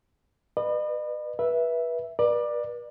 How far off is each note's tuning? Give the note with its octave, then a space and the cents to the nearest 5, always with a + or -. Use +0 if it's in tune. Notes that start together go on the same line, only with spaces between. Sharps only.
B4 +0 D#5 -45
B4 -25 E5 +0
B4 -40 D5 +20